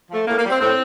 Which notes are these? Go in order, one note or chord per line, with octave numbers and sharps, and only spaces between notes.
F3 A3
A2 A#3
A#3
G3
C4
A2 C4